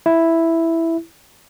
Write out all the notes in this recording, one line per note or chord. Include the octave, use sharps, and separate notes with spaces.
E4